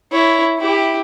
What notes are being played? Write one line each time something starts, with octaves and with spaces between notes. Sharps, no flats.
E4 C#5
E4 G4